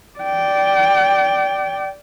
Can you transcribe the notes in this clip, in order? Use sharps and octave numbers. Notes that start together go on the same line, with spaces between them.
D5 G5